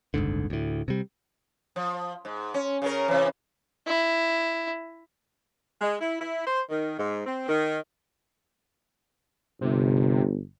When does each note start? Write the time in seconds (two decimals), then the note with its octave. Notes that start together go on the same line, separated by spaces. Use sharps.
0.14 F#1 C2 G#2 D3
0.50 D2 A2
0.88 C3 G3
1.76 F3
2.25 G#2
2.54 C#4
2.82 C#3 C#4 A#4
3.08 C3 E3
3.87 E4
5.81 G#3
6.01 E4
6.20 E4
6.47 C5
6.69 D#3
6.99 G#2
7.26 C4
7.49 D#3
9.61 G1 C3